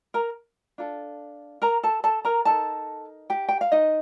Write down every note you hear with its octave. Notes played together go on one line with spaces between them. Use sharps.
A#4 A#5
D4 F4 A4
A#4 A#5
A4 A5
A4 A5
A#4 A#5
D#4 A4 A#4 A5
G4 G5
G5
F5
D#4 D#5